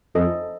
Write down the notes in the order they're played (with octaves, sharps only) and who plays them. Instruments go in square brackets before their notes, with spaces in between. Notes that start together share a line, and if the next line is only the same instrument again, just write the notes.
[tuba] F2 [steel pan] A4 C5 D#5